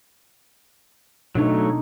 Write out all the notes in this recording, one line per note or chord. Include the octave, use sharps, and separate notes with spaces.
B2 F#3 A3 D4 D#4 C#5